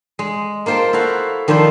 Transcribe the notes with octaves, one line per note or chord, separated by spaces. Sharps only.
G#3
A#3 F4 C5 G5 A5
E4 F#4 A4 F5 F#5
D#3 F3 D4 E4 C5